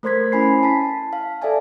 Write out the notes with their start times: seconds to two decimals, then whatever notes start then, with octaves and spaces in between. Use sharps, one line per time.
0.03 A3 A#4 C5 C6 G#6 B6
0.32 C#4 E4 G#5 B5 C7
0.63 A5 B6
1.13 F5
1.42 A4 D5 E5 G#5 A5